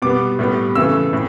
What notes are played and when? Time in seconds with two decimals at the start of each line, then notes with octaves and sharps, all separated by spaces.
0.02 B2 G3 B3 D6
0.39 A2 G3 B3
0.75 C#3 E3 A3 E6
1.13 A2